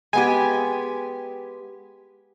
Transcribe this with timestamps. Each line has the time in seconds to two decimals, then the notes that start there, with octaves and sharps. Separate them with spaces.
0.13 G#3 B3 G4 G#5